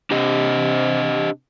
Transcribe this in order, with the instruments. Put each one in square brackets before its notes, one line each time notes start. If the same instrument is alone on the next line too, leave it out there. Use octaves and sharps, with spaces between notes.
[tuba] C3 [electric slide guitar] D4 G4 D#5